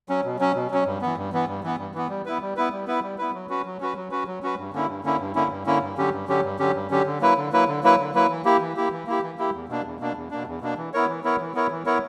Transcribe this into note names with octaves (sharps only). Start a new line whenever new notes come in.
F#3 C#4
B2
F#3 C#4
B2
F#3 C#4
G2
E3 B3
G2
E3 B3
G2
E3 B3
G2
E3 B3
G3
B3 E4 B4
G3
B3 E4 B4
G3
B3 E4 B4
G3
B3 E4 B4
F#3
C#4 F#4 B4
F#3
C#4 F#4 B4
F#3
C#4 F#4 B4
F#3
C#4 F#4 B4
G2
D3 A#3 C#4 E4
G2
D3 A#3 C#4 E4
G2
D3 A#3 C#4 E4
G2
D3 A#3 C#4 E4
G2
D3 F#3 C#4 G4
G2
D3 F#3 C#4 G4
G2
D3 F#3 C#4 G4
G2
D3 F#3 C#4 G4
D3
F#3 A#3 E4 B4
D3
F#3 A#3 E4 B4
D3
F#3 A#3 E4 B4
D3
F#3 A#3 E4 B4
E3
A#3 E4 G4
E3
A#3 E4 G4
E3
A#3 E4 G4
E3
A#3 E4 G4
E2
B2 A#3 D4
E2
B2 A#3 D4
E2
B2 A#3 D4
E2
B2 A#3 D4
E3
B3 E4 A#4 C#5
E3
B3 E4 A#4 C#5
E3
B3 E4 A#4 C#5
E3
B3 E4 A#4 C#5